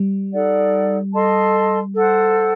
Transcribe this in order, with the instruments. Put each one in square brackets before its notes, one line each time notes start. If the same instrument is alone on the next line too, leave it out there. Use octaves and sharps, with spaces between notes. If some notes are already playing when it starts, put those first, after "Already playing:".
Already playing: [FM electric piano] G3
[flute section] D#4 A4 D5 F#5
A4 D#5 A5 C6
A4 C5 F#5